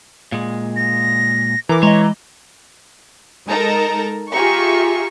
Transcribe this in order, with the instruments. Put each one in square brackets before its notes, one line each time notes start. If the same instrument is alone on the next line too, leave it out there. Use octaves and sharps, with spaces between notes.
[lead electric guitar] A#2 G#3
[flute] A#6
[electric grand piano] E3 [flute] A#4 [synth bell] A#5 D6
[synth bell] G#3 D#5 [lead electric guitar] C#5 [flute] A#5
[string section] G#3 D#4 A4 A#4 A5 A#5
F4 G4 G#4 E5 A#5 C#6